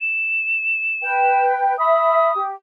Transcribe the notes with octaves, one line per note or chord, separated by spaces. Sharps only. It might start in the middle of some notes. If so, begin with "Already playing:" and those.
E7
B4 G5
E5 B5 D#6
G4